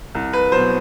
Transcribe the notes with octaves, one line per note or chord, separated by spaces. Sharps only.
C2
B4
B2 F#3 C5